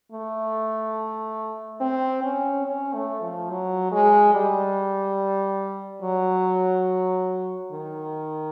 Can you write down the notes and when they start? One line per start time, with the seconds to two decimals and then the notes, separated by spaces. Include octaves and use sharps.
0.12 A3
1.81 C4
2.23 C#4
2.65 C#4
2.94 A3
3.21 F3
3.50 F#3
3.92 G#3
4.34 G3
6.02 F#3
7.72 D#3